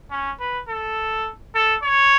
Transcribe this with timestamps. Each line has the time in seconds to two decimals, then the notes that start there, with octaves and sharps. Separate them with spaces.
0.11 C#4
0.40 B4
0.68 A4
1.55 A4
1.83 C#5